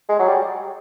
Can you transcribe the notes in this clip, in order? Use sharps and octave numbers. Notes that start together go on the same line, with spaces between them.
G#3
F#3
G3